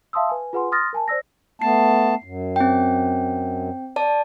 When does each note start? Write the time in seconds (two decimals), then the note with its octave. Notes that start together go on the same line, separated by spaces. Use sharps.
0.13 E5 F5 A5 C6 D#6 E6
0.29 B4 G#5
0.53 F4 G#4 B4 F#5 G#5 C6
0.72 C6 D#6 F6 A6 A#6
0.93 A#4 G#5 A5
1.08 C5 D5 E6 A#6
1.62 A3 B3 A5 C7
2.24 F#2
2.56 C4 G5
3.96 D5 A5